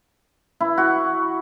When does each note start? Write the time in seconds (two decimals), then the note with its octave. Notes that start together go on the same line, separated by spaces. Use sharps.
0.61 E4
0.78 F#4